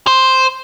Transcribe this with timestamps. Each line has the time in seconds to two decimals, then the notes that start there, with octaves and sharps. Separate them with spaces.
0.07 C5